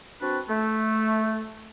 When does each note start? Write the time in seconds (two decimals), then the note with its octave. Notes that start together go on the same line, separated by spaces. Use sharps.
0.21 C4 D4 F#4 B4
0.49 A3